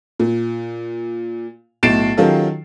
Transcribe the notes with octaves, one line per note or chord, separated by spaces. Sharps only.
A#2
B1 A2 A6 C7 D7 E7
D#3 F#3 C#4 F4 G4 A4